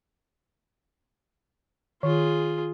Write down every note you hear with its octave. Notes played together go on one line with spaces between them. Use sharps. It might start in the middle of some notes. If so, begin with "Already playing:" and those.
D#3 F4 G#4